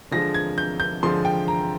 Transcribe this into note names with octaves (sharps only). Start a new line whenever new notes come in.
D3 F3 G#3 A#6
G#6
G6
G6
D3 F3 G#3 C6
G5
A#5